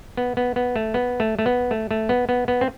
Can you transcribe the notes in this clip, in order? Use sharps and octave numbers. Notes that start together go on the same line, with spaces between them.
B3
B3
B3
A3
B3
A3
A3
B3
A3
A3
B3
B3
B3
C4